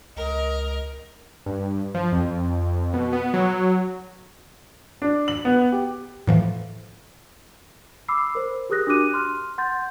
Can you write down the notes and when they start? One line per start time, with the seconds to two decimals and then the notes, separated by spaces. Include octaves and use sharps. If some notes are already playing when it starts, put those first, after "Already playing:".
0.17 C#2 A#4 D#5
1.46 G2
1.95 F3
2.12 F2
2.94 B2
3.13 B3
3.33 F#3
5.02 D4
5.28 F#7
5.45 B3
5.72 G4
6.27 A2 E3 F3
8.08 B5 D6 E6 C7
8.35 A#4 C5
8.70 G4 G#4 A#4 D#6 F#6 A#6
8.87 D4 F#4 G4 D6 F#6 D#7
9.14 C6 F6
9.58 F#5 C6 G6 A6